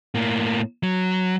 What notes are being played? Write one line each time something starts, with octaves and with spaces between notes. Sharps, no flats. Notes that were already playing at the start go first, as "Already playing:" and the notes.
A2 A#3
F#3